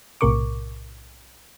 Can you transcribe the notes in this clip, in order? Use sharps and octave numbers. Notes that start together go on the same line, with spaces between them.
B1 A2 C3 A#4 C#6 D6